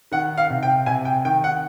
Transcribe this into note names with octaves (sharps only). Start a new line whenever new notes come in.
D#3 F#5
F5
C3
G5
C3 G#5
G5
D#3 G5
F#5